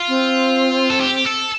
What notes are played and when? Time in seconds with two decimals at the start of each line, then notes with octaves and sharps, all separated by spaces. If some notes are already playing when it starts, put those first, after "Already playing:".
Already playing: F4
0.08 C4
0.90 A4
1.01 G4
1.25 A4